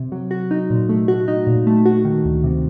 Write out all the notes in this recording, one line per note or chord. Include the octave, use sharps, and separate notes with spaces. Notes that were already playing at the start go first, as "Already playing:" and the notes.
Already playing: C3
F#3
F#4
D#4
A#2
A3
F#4
D#4
A#2
A3
F#4
D#3
D2
C3